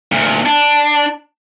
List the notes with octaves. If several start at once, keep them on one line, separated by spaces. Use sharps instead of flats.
D2 A#2
D4